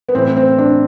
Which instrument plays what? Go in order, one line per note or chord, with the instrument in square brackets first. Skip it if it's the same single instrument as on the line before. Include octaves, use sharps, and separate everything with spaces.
[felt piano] B3
A2 E3 C4
C4
D4